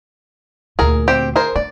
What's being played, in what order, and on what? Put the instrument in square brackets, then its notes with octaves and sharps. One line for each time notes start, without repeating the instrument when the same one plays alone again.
[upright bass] D2 A#2 [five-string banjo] G#4 A#4
[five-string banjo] C4 G4
G#4 A#4 C5
[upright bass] D4 [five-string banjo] D5